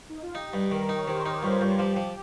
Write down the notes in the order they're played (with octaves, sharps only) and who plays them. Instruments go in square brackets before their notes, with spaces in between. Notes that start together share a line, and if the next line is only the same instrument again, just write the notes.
[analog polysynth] D#4
F4
[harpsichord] D#4 [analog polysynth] G4
[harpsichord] G2
[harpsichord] D#3 [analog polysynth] A#4
[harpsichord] D#4
[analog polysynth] C#5
[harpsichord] D#3 [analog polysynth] C5
[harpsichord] D#4 [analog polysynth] G4
[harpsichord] G2 [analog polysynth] F4
[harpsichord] G2 [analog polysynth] F4
[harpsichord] F3 [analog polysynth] G4
[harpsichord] F3